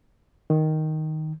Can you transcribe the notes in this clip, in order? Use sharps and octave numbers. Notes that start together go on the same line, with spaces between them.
D#3